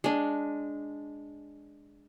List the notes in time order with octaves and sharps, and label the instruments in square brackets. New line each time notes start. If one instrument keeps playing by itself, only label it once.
[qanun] G#3 D4